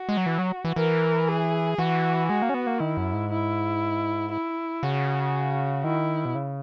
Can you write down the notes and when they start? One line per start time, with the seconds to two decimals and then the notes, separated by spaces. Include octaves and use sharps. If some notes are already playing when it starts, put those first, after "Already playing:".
Already playing: F#4
0.09 G#3
0.17 F#3
0.26 E3
0.38 F#3
0.65 E3
0.76 E3 A#4
1.28 G#4
1.78 E3 F#4
2.29 G#3 F#4
2.42 A#3
2.49 C#4
2.54 B3
2.67 A#3
2.79 D#3 E4
2.97 F#2
3.13 G#2
3.31 E4
4.32 E4
4.83 C#3 F#4
5.84 D#3 E4
6.25 B2
6.35 C#3